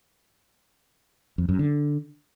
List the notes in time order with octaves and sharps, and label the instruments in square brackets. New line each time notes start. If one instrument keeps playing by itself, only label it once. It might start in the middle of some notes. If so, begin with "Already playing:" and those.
[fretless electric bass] F2
F#2
D3